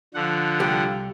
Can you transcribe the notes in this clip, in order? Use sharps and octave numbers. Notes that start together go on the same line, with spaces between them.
D3 F3 F#5
C2 G3 G4